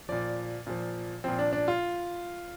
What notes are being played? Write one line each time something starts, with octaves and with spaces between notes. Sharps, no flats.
A#2 F3 D5
A#2 F3
A#2 F3 C4
D4
D4
F4